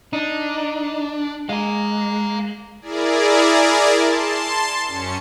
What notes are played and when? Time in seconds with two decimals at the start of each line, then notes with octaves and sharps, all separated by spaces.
0.13 D4 D#4
1.49 G#3 F5 A#5
2.82 E4 G#4 A#4 D5
3.97 A5 C6
4.87 F#2 C#4 C#7